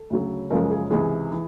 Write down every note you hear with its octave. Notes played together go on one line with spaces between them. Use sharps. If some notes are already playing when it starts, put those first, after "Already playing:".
Already playing: A4
D2 C#3 F#3
F#2 C#3 F3 G#3 A#4
G#4
C#2 C3 E3 G#4
E3